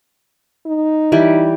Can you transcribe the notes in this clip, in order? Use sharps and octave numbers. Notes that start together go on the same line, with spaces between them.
D#4
E3 G3